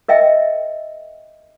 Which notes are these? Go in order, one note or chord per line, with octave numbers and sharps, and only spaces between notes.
A#4 D#5 E5 G5